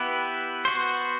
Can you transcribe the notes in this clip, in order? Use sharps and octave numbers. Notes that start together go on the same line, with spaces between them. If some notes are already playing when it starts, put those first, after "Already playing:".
Already playing: B3 E4 G4 B4
B3 F#4 C5